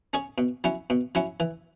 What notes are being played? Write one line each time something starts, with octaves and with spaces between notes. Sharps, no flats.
C#4 G#4 C#5
B2
F#3 C#4 E4
B2
F#3 C#4 E4
E3